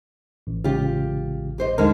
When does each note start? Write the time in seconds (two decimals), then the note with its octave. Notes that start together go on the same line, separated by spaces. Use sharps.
0.47 A1
0.64 C#3 G#3 F4 G4
1.58 G#2 G4 C5 D#5
1.78 D#2 D3 G#3 D#4 A#4 F6